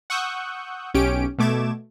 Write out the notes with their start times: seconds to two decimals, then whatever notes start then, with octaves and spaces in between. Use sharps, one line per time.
0.10 F#5 C#6 D#6 E6 F#6 G6
0.94 B1 C#4 G4 D7
1.38 B2 A3 D6 G#6 E7